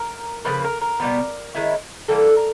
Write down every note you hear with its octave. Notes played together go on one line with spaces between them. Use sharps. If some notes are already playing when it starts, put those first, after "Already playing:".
Already playing: A#4
C#3 F3 A#3 B4
A#4
A#4
B2 G3 B3
D#3 G#3 C#4 E4
E3 G3 A#3 A4
A#4